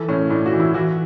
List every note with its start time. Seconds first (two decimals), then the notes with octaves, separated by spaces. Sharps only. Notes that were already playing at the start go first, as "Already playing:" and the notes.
Already playing: E3 A4
0.08 A2 C#4
0.30 A2 D4
0.46 F#4
0.53 E3
0.60 E4
0.74 E3 F#4